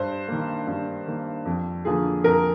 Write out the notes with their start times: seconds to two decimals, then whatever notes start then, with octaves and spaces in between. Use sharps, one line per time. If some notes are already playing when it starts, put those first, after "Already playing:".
Already playing: G2 C5
0.28 D#3 A#3
0.67 G2
1.07 D#3 A#3
1.45 F2
1.85 D3 F3 A#3 G#4
2.24 F2 A#4